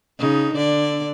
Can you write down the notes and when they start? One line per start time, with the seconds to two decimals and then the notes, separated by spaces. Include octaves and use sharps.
0.19 C#3 D#4
0.54 D3 D5